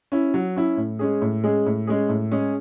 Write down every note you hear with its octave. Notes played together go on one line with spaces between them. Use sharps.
C#4 E4
F#3
C#4 E4
A2
G#3 C#4 G#4
A2
G#3 C#4 G#4
A2
G#3 C#4 G#4
A2
G#3 C#4 G#4